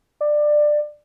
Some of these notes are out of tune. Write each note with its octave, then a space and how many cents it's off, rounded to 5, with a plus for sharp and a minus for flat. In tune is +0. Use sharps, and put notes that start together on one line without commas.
D5 +20